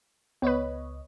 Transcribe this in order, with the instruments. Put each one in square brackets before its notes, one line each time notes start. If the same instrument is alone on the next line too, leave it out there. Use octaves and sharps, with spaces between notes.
[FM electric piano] C#2 C#5 D#5 [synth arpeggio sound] B3 B4